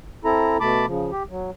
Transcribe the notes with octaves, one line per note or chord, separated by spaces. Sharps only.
C4 E4 A4 A#5
B2 A3 A5 B5 D6
C#3 F3
G4
F#3